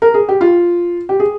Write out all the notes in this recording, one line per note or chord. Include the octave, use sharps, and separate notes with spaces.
A#4
G#4
G4
F4
G4
G#4